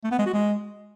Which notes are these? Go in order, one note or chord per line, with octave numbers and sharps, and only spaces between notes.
A3
B3
G#3
F#4
G#3